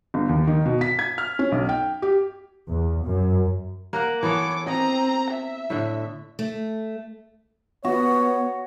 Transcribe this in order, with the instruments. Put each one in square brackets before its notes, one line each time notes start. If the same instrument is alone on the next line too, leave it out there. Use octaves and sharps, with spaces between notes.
[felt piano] G1
D#2
D#3
B2
B6
G#6
F6
C#4
B1
G5
G4
[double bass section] E2
F#2
[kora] A#3 A#4 F#5
[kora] E3 B3 A4 [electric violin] C#5 D6
[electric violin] C4 A#5 [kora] D#5
[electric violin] E5
[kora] A2 D3
[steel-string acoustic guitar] A3
[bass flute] B3 [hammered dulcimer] F#4 [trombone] C#5